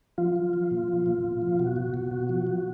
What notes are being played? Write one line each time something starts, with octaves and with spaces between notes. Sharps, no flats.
F3 F4
F3
F3
A#2
F3
A#2
A#2
F3
B2 F#4
B2
B2
B2
F3
F3